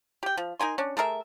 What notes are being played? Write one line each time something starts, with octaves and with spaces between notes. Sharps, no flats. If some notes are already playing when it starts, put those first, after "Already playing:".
G4 G5
F3
D#4 A#4 G#5 C6
C#4 D4
A3 G#4 A#4 E5